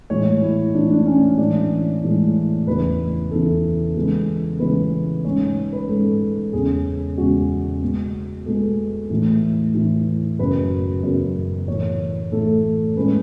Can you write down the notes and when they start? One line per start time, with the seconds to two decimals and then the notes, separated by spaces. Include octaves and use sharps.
0.10 A2 E3 G#3 C#5
0.41 E4
0.74 A2 E3 G#3 D4
0.91 D4
1.06 C#4
1.22 C#4
1.38 A2 E3 G#3 D4
2.03 A2 E3 G#3
2.67 E2 C#3 E3 B4
3.31 E2 C#3 E3 A4
3.96 C#3 E3 G#3 B3
4.59 C#3 E3 G#3 B3 B4
5.24 G#2 G#3 C#4 C#5
5.73 B4
5.89 G#2 G#3 C#4 A4
6.53 E2 C#3 G#3 C#4 G#4
7.17 E2 C#3 G#3 C#4 F#4
7.82 B2 G#3 B3
8.46 B2 G#3 B3 A4
9.10 A2 E3 A3
9.74 A2 E3 A3
10.39 F#2 C#3 F#3 B3 B4
11.03 F#2 C#3 F#3 B3
11.68 A2 E3 A3 C#5
12.32 A2 E3 A3 A4
12.96 A2 G#3 C#4 B4